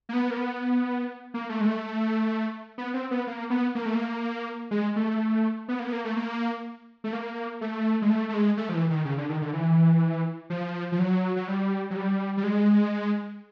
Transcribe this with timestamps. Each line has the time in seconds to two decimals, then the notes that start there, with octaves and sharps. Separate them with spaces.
0.09 A#3
0.13 B3
0.30 A#3
0.37 B3
1.34 A#3
1.49 A3
1.61 G#3
1.66 A3
2.78 B3
2.94 C4
3.11 B3
3.27 A#3
3.50 B3
3.75 A#3
3.86 A3
3.95 A#3
4.71 G#3
4.96 A3
5.68 B3
5.80 A#3
5.87 B3
5.92 A#3
6.05 A3
6.17 A#3
7.04 A3
7.13 A#3
7.61 A3
8.02 G#3
8.10 A3
8.29 A3
8.34 G#3
8.57 A3
8.69 F3
8.74 E3
8.90 D#3
9.05 C#3
9.18 D3
9.29 D#3
9.42 D3
9.53 E3
10.50 F3
10.92 F3
10.99 F#3
11.36 F#3
11.47 G3
11.90 F#3
11.96 G3
12.37 G3
12.43 G#3